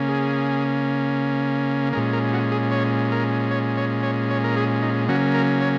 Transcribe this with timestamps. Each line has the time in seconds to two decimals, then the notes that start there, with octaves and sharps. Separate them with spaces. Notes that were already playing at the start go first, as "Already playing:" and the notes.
Already playing: C#3 A#3 C#4
0.09 G#4
1.93 A#2 G#3 C#4 A#4
2.13 A#4
2.33 F#4
2.52 G#4
2.71 C#5
3.12 A#4
3.51 C#5
3.77 C#5
4.03 C#5
4.30 C#5
4.44 A#4
4.57 G#4
4.82 D#4
5.08 C#3 F#3 A#3 C#4 F#4
5.34 A#4
5.61 C#5